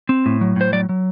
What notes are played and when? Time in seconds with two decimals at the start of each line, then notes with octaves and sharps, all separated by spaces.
0.09 C4
0.26 A2
0.41 F#3
0.56 A2 C5
0.73 F#3 D5
0.89 F#3